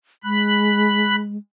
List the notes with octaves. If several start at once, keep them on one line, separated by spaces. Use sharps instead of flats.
G#3 B5 F#6